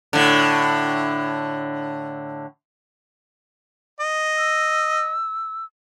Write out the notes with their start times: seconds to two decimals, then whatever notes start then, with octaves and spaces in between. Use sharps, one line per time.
0.13 A2 D3
4.00 D#5
4.37 E6